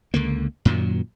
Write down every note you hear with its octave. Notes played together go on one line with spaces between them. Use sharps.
C#2 D3 A#3
F#2 A#2 D#3 F#3